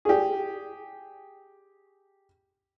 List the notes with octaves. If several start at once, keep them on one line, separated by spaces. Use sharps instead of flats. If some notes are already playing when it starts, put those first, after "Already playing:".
G4 G#4